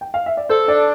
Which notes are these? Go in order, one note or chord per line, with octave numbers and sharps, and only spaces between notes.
G5
F5
E5
D5
A4 C5
D4 D5